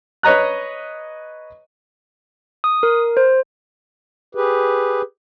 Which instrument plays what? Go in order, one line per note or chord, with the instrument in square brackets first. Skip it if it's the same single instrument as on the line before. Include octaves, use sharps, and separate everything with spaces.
[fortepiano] B4 C#5 D#5 A#5 F#6
[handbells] D#6
A#4
C5
[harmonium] G4 G#4 B4